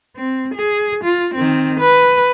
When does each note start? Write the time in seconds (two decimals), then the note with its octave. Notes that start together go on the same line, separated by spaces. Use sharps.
0.16 C4
0.55 G#4
1.04 F4
1.34 D#3 C4
1.80 B4